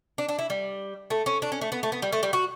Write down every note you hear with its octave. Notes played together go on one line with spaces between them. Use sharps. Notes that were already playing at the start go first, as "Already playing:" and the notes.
D4
D4
E4
G3
A3
C#4
D4
C#4
A3
B3
A3
B3
G3
A3
G3
F#4